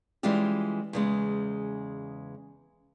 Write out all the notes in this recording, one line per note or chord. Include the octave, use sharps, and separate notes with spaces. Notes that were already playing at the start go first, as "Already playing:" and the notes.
E3 G3 G#3 C#4 F4 G4
E2 C#3 G#3